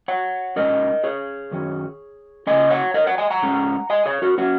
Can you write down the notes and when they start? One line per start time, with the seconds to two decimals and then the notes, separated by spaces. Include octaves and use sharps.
0.08 C#5 F#5
0.56 A#2 G#3 C#4 A#4 D#5
1.04 G#4 C#5
1.51 F#2 D#3 F#3 C#4
2.47 C#3 A#3 C#4 D#5 G#5
2.70 C#5 F#5
2.94 A#4 D#5
3.06 C#5 F#5
3.18 D#5 G#5
3.30 F#5 A#5
3.42 G#2 G#3 C#4
3.90 D#5 G#5
4.06 G#4 C#5
4.22 F#4 A#4
4.38 F#3 A#3 C#4 F#4